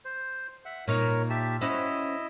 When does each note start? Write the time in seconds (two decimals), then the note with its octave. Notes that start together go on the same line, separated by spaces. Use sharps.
0.05 C5
0.65 E5 F#5
0.88 A#2 D#4 A#4 C#5
1.30 G4 E5 A5
1.61 C#4 E4 F#4 C5 D#5 E6